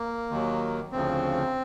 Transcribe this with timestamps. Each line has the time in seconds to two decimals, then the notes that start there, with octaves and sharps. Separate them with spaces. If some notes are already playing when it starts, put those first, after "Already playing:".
Already playing: A#3
0.29 D#2 D#3 F#3
0.92 D2 C#3 F3 C4